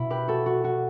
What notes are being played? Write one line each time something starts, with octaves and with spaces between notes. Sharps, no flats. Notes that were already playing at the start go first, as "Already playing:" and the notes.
Already playing: B2 E4
G4 B4
F#4 A4
F#4
F#4